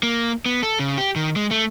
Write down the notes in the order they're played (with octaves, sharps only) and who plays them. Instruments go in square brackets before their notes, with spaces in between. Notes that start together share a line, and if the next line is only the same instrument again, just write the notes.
[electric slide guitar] A#3
B3
A4
C#3
G4
D#3
G#3
A3